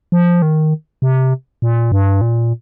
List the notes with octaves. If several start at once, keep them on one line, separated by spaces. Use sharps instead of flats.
F3
D#3
C3
A#2
G2
A#2